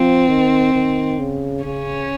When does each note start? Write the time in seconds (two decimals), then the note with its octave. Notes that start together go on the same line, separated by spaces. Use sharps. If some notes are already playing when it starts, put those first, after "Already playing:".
Already playing: F3 C4
0.28 D#3
0.74 D#3
1.19 C#3
1.65 C#3 C#4